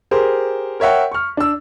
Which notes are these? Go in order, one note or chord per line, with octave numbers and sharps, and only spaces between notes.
G4 G#4 A#4 C5
A#4 C#5 E5 F#5 G5
C#6 F6
D4 E6